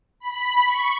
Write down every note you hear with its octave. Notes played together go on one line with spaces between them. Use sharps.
B5
C#6